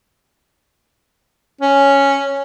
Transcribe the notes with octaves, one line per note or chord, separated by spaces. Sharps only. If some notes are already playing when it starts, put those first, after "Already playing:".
C#4